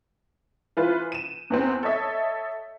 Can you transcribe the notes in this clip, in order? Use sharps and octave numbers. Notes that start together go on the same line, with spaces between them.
E3 F4 B4 C5
D#7 E7
E2 B3 C4
A4 C#5 D#5 E5